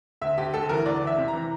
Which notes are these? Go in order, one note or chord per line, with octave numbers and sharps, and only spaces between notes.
D2 E5
D2 G4
D2 A4
E3 A#4
D2 D5
E3
E5
C3
A#5
E3